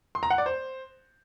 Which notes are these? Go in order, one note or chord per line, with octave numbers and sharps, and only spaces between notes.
C6
A#5
F#5
D5
C5